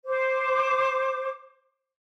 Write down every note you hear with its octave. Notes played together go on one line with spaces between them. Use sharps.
C5 D6